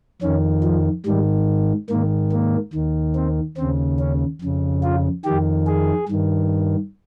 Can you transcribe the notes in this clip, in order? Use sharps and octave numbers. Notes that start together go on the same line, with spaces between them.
F2 D#3 C#4
F3
G#2 D#3 G3
G#2 D#3 A#3
A#3
D#2 D#3
C4
D#2 C#3 C4
C#4
F2 C#3
F4
F2 D#3 G4
G#4
G2 D#3